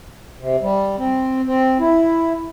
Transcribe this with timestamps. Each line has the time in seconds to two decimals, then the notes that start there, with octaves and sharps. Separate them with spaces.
0.40 C3
0.62 G3
0.98 C4
1.46 C4
1.80 E4